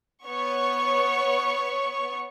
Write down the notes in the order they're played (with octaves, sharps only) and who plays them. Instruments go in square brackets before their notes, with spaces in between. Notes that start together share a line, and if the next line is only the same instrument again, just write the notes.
[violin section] B3 C#5 C#6